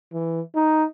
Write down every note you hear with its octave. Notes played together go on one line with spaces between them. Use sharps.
E3
D#4